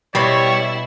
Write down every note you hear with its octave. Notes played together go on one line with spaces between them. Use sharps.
B2 G3 E4 C5 C#5 B5 E6